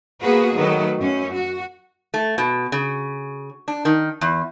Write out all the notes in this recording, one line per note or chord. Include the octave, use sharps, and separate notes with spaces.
A#3 B3 F#4 G#4 B4
D#3 F#3 A3 B4
F#2 C#4
F#4
A3
B2
C#3
D4
D#3
E2